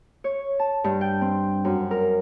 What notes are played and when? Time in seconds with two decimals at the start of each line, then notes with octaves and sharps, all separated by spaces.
0.24 C#5
0.59 A5
0.84 G2
1.01 G5
1.21 C4
1.65 F#2
1.91 A#4